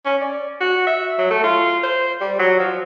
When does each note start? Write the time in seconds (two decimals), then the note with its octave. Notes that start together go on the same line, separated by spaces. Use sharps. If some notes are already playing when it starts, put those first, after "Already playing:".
0.05 C#4
0.21 D5
0.61 F#4
0.87 E5
1.19 F#3
1.30 A3
1.44 F4
1.83 C5
2.21 G3
2.39 F#3
2.59 F3